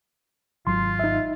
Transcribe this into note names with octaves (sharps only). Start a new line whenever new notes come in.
G#1 F#3 F4 C6
D#4 E5